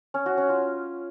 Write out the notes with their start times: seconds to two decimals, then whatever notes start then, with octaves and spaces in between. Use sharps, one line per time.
0.14 C#4
0.26 F#4
0.38 C#4
0.49 F4